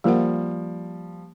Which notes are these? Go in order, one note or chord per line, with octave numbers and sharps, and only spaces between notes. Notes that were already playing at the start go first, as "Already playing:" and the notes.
F3 G3 A#3 A#4 F#5